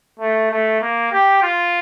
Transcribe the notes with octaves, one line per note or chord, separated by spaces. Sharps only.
A3
A3
A#3
G4
F4